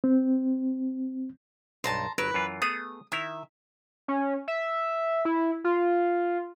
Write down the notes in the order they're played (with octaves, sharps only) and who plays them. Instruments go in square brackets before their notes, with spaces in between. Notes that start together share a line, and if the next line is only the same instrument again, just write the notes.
[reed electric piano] C4
[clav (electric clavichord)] B1 G2 [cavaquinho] A5 A#5 C6
[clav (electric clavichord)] G1 F#3 A#4 [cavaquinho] B4
[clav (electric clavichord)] F#2 E3 F4
[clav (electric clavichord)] A3 B3 G#4 [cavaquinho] D#6
[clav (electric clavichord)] D#3 E4 A#5 [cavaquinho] E5
[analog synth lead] C#4
E5
E4
F4